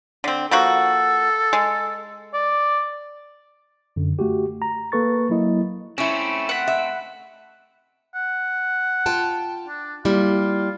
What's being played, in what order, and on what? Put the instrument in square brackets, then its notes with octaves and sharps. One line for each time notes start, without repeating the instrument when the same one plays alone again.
[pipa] D3 C4
[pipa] F3 A#3 F#4 [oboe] A4
[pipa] G#3
[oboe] D5
[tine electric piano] F#2 D3
A3 F#4 G4
A#5
A#3 A4 B4 C#6 A6
F#3 A#3 E4 D#5
[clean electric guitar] A3 C4 [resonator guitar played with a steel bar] C#4 E4
[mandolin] F#5 B5
[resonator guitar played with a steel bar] E5
[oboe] F#5
[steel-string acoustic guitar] F4 G5 A5
[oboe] D4
[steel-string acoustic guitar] G3 A#3 E4 [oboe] F4